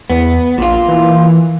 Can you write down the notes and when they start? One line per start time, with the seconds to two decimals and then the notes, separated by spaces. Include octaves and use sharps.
0.10 E2 B3
0.58 A#1 A#2 F4
0.88 E3